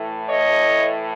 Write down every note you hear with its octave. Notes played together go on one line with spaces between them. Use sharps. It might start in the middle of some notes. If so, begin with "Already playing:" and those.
Already playing: A2 E3 A3
C#5 D#5